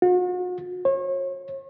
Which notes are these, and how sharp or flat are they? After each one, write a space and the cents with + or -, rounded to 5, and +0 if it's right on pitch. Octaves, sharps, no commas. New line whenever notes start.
F#4 -45
C#5 -40